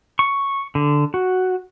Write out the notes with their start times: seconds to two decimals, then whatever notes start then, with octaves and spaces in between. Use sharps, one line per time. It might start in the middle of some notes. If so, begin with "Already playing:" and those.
0.19 C#6
0.75 D3
1.14 F#4